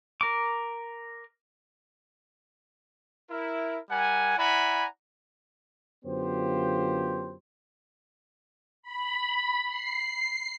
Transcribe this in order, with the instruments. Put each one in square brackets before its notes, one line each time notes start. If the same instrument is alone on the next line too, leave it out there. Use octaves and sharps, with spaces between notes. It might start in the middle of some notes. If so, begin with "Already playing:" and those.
[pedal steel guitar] A#4 D6
[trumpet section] E4 A#4
G3 A#4 F#5 G#5
E4 D5 F#5 G#5 A#5 B5
[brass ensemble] F#2 D3 B3 F4 G4 C5
[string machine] B5
C7